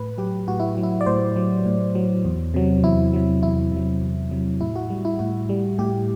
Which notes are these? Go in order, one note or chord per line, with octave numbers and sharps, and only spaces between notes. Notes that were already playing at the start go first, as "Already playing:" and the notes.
Already playing: A2 B4
F#3 G4
A2 F#4
E4
F#3
E4
D5
A2 C5
F#3
A2
F#3
E2
C3 F#3
E2 E4
C3 F#3
E2 E4
C3 F#3
E2
C3 F#3
A2 E4
F#4
G3
E4
A2 F#4
G3
A2 G4